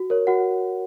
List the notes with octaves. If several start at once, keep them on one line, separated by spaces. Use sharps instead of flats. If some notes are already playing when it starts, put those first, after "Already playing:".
Already playing: F#4
A#4 C#5
F#4 F#5